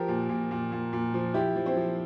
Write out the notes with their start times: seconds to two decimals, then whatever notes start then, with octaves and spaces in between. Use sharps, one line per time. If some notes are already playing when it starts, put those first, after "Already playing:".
Already playing: F3 G4 A#4
0.08 A#2
0.29 A#2
0.51 A#2
0.72 A#2
0.93 A#2
1.14 F3
1.34 F3 E4 G4
1.56 F3
1.66 C4 E4
1.76 F3